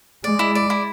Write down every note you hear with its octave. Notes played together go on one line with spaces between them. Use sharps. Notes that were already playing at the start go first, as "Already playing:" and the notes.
G#3 D5
E4
D5
E4